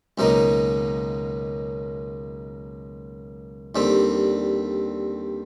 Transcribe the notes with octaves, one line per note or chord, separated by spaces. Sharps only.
C#2 B2 F#3 A#3 D#4
D#2 D3 G3 C4